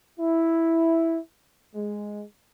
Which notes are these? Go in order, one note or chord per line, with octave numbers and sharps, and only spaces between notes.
E4
G#3